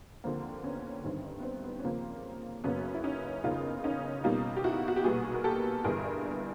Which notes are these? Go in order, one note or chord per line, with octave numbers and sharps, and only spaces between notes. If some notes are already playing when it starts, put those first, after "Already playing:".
D#2 D3 F3 A#3 C4
B3 C#4
G1 G2 D#3 C4
B3
C4
B3
C#4
D#2 C#3 F3 A#3 C4
F#2 C#3 F#3 A#3 B3 C#4
E4
C#4 D#4
F#1 E2 C#3 D#4 F4
C#4 D#4
B1 B2 G3 A#3 D#4 F4
G4
E4 F#4
F#4
G4
B1 A#2 G3 B3 F#4 G#4
A#4
G4 A4
G1 G2 E3 G#4 A#4